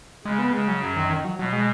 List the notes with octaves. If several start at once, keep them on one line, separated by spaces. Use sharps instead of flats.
C#3 G#3
B3
C#3 G#3
F#3
F#2 F#3
D#3
D#3
F#3
B2 F#3
G#3